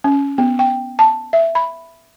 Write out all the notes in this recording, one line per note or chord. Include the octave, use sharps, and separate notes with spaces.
C#4
B3
G5
A5
E5
B5